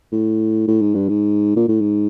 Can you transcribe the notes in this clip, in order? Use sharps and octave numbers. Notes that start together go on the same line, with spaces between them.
A2
A2
G#2
G2
G#2
A#2
A2
G#2